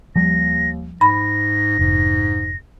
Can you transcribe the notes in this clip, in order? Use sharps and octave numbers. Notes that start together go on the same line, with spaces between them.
D#2 F3 G3 A#6
G#2 B5 A#6
F1 G#2